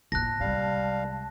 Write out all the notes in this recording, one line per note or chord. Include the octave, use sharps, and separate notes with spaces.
A2 A#3 A5 F#6 A#6
C2 G3 G#3 F5